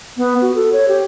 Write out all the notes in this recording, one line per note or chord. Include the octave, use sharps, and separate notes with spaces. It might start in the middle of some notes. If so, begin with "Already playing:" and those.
B3
F#4
A4
C#5
G4